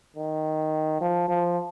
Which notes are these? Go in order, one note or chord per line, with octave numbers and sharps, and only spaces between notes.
D#3
F3
F3